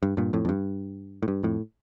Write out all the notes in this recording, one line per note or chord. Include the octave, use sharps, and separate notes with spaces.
G2
G2 A#2
F2 A2
F2
G2
A2
G2
F2 A2